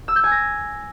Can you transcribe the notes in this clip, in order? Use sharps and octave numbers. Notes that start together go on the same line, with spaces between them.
E6
G6
G#5
A#6